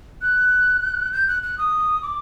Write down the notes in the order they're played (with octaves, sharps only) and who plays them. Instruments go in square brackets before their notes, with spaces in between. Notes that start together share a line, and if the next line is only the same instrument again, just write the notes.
[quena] F#6
G6
F#6
F#6
D#6
D6